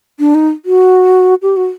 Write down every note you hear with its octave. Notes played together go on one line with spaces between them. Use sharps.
D4
D#4
F#4
G4
F#4